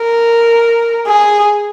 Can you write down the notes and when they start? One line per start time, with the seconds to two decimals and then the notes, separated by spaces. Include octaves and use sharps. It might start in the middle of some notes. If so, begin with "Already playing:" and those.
Already playing: A#4
1.08 G#4